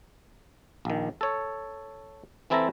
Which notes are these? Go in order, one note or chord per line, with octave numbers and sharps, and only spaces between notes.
A#1 D#3
A4 C#5
E3 C4 E4 A4 E5 A#5